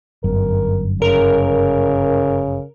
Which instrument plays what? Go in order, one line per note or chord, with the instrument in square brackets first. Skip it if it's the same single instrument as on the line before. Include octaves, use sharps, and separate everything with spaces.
[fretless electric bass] G1 F#2 [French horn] A#4
[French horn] C#3 [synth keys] A#4